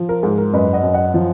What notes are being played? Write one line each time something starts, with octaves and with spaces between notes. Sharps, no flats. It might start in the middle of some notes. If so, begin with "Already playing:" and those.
Already playing: F3
A#4
G#2 G#4
A#4
F#2 B4 D#5
D#5 F#5
F#2
D#5 F#5
F3